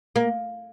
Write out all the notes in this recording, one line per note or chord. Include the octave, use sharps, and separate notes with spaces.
A#3